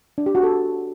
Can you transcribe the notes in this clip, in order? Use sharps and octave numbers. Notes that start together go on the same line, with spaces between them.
D4
G4
F#4
A4